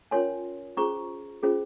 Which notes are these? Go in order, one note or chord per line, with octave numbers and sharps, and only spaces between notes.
C#4 F4 A#4 C#5 G#5 C6
C#4 F4 G#4 C5 A#5 C#6
C#4 F4 G#4 C5